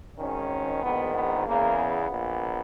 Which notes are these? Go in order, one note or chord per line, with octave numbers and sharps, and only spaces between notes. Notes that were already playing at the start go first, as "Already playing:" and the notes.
G#1 G#2 D#3 C#4
A#1 G#2 D#3 B3
B3
E2 C#3 E3 A#3
B3
A#1 A#2